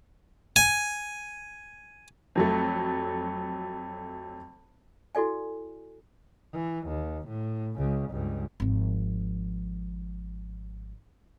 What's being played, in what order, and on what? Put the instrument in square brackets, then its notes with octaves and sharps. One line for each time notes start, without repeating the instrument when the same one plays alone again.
[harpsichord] G#5
[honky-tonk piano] F2 F#3 A3
[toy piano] E4 F#4 A4 D5 G#5
[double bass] E3
D#2
A2
C#2 C#3
C#2 G2
[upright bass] G#1 F3